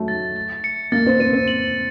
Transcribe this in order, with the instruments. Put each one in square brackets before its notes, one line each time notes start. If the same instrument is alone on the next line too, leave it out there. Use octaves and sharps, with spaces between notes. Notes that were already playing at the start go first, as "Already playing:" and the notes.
Already playing: [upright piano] F#3 A3
[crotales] A6
A6
C#7
[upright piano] A#3 [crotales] A6
[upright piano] C4
[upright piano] C4 [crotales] D#7
[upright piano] C4
[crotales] F#7